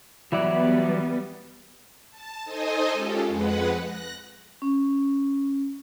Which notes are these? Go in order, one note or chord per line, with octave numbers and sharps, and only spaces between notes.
E3 F#3 G3 B3 E4 D5 F#5
A5
D#4 A4 C5 D#5 G#5 D#6
G#3 C#4 F4 G4 A4
F2 G#3 B4 F#5
F#6 A#6
C#4